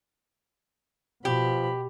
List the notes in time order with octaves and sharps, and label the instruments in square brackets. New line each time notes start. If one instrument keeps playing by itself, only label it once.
[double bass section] B2 [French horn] F3 [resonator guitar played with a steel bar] G4 [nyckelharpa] B5